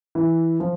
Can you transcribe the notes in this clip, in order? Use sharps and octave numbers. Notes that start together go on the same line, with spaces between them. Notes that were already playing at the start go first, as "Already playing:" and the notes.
E3
F3